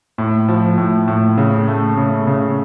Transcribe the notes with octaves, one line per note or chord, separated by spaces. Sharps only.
A2
F3
A2
A2
C#3
A3
C#3
C#3